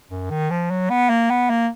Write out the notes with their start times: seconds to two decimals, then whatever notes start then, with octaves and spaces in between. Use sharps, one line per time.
0.10 F#2
0.30 D#3
0.50 F3
0.70 F#3
0.90 B3
1.10 A#3
1.30 B3
1.50 A#3